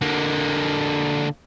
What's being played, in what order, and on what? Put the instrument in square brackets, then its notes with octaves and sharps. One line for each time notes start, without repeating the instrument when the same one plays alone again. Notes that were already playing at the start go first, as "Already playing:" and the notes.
[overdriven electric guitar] D3 A#3